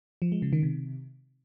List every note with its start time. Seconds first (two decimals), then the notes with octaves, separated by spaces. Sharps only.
0.22 F3
0.32 G#3
0.42 C#3
0.53 D#3
0.63 C3